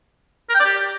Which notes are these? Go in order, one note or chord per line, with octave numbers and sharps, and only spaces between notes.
A#4
G5
D5
G4